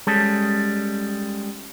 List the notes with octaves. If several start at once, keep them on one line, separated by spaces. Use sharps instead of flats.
G3 G#3 C#4 A4